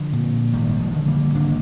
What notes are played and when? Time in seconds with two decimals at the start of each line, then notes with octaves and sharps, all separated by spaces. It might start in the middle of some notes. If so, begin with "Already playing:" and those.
Already playing: D3 F3
0.13 A#2
0.54 G#1 D#3 G3
0.80 F3 G#3
0.94 D3
1.07 G3 A#3
1.35 G#1 A#3 D4